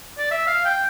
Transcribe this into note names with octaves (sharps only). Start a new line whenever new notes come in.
D5
E5
F5
G5